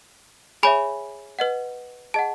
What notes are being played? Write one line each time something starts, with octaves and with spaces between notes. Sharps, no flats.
G#4 C#5 E5 G#5 B5
B4 D#5 F#5
G#4 D#5 F#5 A5